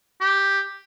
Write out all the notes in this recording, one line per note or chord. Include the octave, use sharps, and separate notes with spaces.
G4